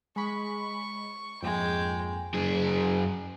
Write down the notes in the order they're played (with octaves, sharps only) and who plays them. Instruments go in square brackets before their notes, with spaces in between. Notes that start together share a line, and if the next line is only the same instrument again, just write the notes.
[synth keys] G#3 B5 [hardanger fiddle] C#6
[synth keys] F2 G#2 A#3 [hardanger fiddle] G#3 G5
[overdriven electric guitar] F#2 G#4